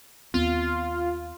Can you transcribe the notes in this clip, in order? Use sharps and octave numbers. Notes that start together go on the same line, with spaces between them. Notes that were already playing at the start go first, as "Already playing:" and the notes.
D#2 B3 C4 F4